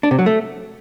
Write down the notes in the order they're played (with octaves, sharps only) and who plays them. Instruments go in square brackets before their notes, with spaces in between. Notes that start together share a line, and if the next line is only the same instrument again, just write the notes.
[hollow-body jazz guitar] D4
C3
F#3
A3